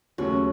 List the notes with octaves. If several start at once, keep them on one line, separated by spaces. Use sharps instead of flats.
D#2 C#3 F#3 A3 C#4 F#4